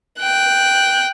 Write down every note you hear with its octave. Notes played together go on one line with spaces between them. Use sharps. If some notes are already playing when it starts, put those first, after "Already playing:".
G5 F#6